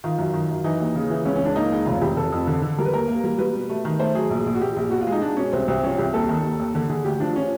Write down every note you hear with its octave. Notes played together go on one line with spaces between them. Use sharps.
D#3 F4
F#2
D#3
F#2
E3 D#4
D#2
C#3
E3
C#2 C#4
C#4
C#2 D4
A#3 D#4
C#2
F1 F4
F1 G4
F1 A4
F2
D3
D3
G3 A#4
B4
D#2 A#4
A#3
G3
G3 B4
B2
A3
D#3
A3 C5
F#3 G#4
A#1
A#1
F#4
A#1 G4
A#1
B2 F#4
F4
G#3
D#4
G#3 D4
B2 C#4
C2 C4
C2 C4
F3 C#4
C2 G4
D#2 A4
D#3
D#2
D#2
D3
D3 G#4
D2 G4
F3 D4
F3 C#4